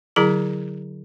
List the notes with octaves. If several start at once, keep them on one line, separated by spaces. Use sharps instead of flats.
D3 F#3 E4 G#4 A#5